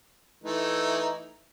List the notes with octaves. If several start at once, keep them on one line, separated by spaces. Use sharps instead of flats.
E3 A3 D#4